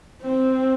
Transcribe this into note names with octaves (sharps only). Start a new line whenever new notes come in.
C4